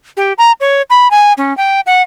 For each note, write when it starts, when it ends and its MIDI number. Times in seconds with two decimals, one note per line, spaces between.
0.17 0.33 67
0.38 0.52 82
0.60 0.82 73
0.90 1.10 83
1.11 1.33 80
1.37 1.55 61
1.57 1.80 79
1.86 2.02 78